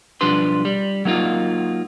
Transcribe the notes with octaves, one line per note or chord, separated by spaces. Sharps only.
B1 F3 G3 D4 B4 C6
G3
F#3 A#3 D#4 F4